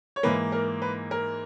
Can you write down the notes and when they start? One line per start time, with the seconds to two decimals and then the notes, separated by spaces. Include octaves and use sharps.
0.16 C#5
0.23 G#2 E3 A#3 B4
0.52 A#4
0.82 B4
1.11 A#4